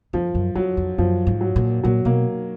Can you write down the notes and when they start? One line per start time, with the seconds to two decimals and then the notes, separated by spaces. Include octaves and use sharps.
0.13 F2 F3
0.35 F#2
0.55 F2 F#3
0.77 F2
0.98 F#2 F3
1.27 G#2
1.41 F#3
1.56 A#2
1.83 A#2 F#3
2.05 B2 A#3